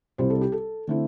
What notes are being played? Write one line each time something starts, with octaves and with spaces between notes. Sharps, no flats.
C2 C3 G3 E4 C5
A4
G4
A4
D3 A3 C4 E4